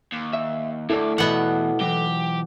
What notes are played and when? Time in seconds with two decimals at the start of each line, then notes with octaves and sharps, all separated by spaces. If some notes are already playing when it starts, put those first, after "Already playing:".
0.12 D#2
0.33 E5
0.90 D2 A3 E4 A4 D5
1.18 E2 B2 B3 F#5
1.81 E3 F#3 G4